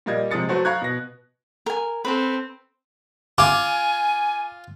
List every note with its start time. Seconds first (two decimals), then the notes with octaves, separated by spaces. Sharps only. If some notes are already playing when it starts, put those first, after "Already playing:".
0.06 A#2 G3 A#3 D#5 G#6
0.31 C3 F3 G#3 D#6 A6 C#7
0.49 F#3 A3 F#4 B4 C5
0.65 F5 A#5 B5 C#6 F#6 G#6
0.82 B2 B3 A#6
1.66 A#4 G#5
2.05 C4 A4 B4
3.38 F4 G#5 D6